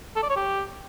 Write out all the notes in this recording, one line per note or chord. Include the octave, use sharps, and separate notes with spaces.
A4
D5
C#5
G4